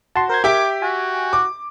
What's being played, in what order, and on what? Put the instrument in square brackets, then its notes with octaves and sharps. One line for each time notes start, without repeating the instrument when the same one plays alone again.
[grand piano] F#4 [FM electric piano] A5 C6
[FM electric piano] A#4 G#6 [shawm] C5
[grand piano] G4 E5 G5 [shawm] D6
[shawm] F#4 [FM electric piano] G#5
[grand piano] D6